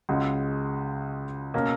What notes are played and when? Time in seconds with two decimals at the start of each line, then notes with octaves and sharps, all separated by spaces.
0.09 C#2 C#3 G#3 C#4 F#4
1.54 B2 A#3 C#4